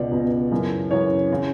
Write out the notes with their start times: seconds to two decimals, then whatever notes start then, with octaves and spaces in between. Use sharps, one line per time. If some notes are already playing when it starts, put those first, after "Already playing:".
Already playing: C#2 B2 D5
0.12 C#2 B2
0.51 F#2 C#3 E3
0.91 F#2 C#3 E3 C#5
1.32 C#3 E3